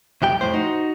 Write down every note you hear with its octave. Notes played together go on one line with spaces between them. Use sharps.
C2 F2 G4 G5
F2 A2 C5
D#4 F#4